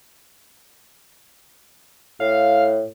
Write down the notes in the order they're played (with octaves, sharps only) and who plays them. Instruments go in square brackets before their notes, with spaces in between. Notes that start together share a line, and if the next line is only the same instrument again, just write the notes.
[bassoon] A2 [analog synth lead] F5